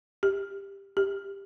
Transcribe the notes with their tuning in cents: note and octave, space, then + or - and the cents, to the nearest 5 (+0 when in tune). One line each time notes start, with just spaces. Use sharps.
G4 +10
G4 +10